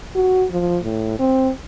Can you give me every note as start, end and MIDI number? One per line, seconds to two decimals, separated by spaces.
0.15 0.46 66
0.51 0.78 53
0.84 1.18 45
1.19 1.50 60